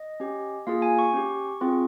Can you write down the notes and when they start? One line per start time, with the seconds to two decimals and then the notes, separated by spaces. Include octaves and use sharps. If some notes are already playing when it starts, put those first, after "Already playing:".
Already playing: D#5
0.20 C#4 G4
0.67 A#3 F4 G#4 F5
0.82 G#5
0.99 C#6
1.14 C#4 G4
1.61 C4 F4 G#4